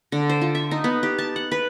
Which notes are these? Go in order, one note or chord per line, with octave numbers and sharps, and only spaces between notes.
D3
C5
F4
E5
D#4
B3
G4
A5
F#5
B4